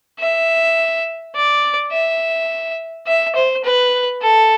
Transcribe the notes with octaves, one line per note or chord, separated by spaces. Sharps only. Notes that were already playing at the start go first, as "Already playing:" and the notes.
E5
D5
E5
E5
C5
B4
A4